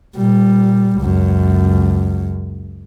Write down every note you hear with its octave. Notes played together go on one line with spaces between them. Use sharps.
A#2 G3
C#2 F#2